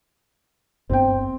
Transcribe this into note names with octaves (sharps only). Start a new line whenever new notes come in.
G1 G2 B3 C4 G5